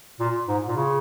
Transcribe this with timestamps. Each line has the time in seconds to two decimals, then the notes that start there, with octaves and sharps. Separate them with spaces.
0.20 A#2
0.48 G#2
0.68 A#2
0.76 C#3